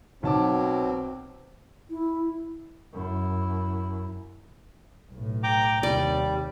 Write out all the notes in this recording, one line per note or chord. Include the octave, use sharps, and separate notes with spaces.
B1 B2 F#3 C4 A5 D6
E4
F#2 E4
B1 A2
G5 A#5 D6
D#2 C3 G3 D5